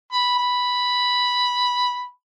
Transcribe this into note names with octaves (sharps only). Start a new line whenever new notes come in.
B5
B5